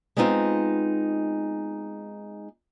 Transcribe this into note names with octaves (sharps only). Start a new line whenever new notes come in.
G#3 B3 C4 D#4 F4